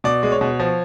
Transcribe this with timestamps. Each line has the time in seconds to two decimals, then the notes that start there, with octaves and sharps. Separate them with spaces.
0.04 B2 D5
0.23 G#3
0.32 C#5
0.41 B2
0.60 F3